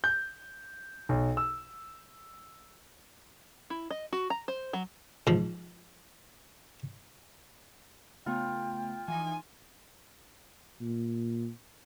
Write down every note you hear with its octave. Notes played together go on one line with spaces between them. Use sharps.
G6
B1
E6
E4
D#5
F#4
A#5
C5
F#3
G#2 F3
C#3 A3 B3 F4 G5
E3 F3 D#4 G#5
A#2